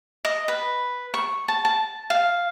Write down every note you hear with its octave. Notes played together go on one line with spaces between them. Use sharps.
D#5
B4
C#6
A5
A5
F5